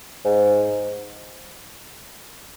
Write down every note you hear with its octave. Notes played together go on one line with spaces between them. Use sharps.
G#2